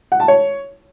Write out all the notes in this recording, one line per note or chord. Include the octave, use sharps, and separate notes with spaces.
F#5
A5
C#5